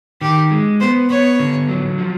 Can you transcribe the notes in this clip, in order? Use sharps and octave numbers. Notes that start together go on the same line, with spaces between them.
D#3 G4
G#3
B3 C5
B3 C#5
D3
F#3
F3